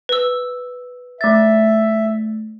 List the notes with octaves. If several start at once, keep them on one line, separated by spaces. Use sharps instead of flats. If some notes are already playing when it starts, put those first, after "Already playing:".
B4 E6
A3 E5 A6